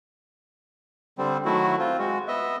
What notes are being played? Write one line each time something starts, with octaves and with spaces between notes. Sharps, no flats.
D3 G3 C4
D#3 F#3 A3 E4 F#4
C4 F4
G#3 F#4
B3 D#5 E5